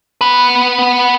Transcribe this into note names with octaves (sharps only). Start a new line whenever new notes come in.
B3 B4